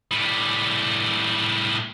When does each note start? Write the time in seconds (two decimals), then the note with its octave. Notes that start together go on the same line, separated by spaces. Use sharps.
0.11 A2 G3